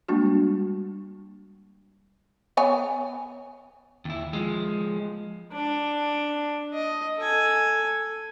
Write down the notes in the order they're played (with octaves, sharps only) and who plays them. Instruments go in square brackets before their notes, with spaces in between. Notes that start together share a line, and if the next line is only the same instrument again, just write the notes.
[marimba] G3 G#3 A#3 D4 F#4
[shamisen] B3 C#5 G#5
[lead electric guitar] D#2 E4
F3 G#3
[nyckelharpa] D4
D#5
A4 G#5